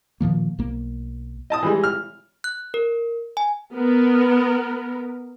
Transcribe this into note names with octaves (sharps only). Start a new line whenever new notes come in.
A#2 D#3 F3 A#3
B1 A#3
D#5 A5 D#6
E3 G3 G#3
F6
F#6
A#4
G#5
B3 A#4